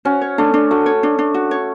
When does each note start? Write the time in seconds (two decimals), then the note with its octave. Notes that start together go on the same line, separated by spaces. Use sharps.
0.05 C#4 F#4
0.21 C#5
0.38 A3 D4
0.54 D4
0.71 A3 F#4
0.86 C#5
1.03 D4
1.19 D4
1.34 F#4
1.51 C#5